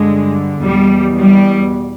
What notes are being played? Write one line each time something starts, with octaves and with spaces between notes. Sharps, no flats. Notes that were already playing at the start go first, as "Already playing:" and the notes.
Already playing: G2 D3 G#3
E2 B2 G3
G3